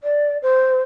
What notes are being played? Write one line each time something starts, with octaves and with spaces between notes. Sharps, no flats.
D5
C5